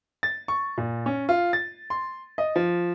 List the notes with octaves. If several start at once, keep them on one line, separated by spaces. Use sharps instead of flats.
A6
C#6
A#2
C#4
F4
A6
C6
D#5
F3